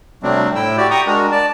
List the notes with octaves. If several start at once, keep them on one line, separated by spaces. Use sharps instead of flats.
C3 F#3 G3 A3 C4 D4
A2 E4 G5 E6
F#4 G4 D5
G5 A#5 C#6 D#6
G#3 D4 F#4 A#4
D5 A5